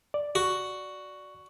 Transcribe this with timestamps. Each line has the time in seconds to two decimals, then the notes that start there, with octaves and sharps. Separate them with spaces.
0.14 D5
0.35 F#4